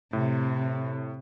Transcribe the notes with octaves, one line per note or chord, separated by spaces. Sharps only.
A2 C3